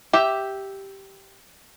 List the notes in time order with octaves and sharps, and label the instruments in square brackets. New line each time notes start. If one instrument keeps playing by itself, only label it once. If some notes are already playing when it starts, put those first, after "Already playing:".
[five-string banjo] G4 E5